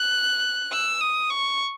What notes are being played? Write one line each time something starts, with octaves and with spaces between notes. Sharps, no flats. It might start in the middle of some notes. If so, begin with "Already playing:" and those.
Already playing: F#6
E6
D#6
C#6